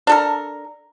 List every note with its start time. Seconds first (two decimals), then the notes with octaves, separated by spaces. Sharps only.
0.07 D4 A4 A#4